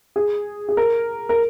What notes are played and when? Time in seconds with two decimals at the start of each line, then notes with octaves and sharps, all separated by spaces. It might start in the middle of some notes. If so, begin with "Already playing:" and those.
0.16 G#4
0.69 G#4
0.77 A#4
1.29 A#4